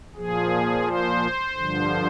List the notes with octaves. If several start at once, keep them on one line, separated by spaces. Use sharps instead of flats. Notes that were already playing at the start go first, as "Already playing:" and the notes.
A#2 F3 G#4
C5
G2 D3 F3